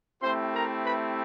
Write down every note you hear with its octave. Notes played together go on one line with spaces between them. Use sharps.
A3 C4 E4 G4 C5 C6
A#4 A#5
B4 B5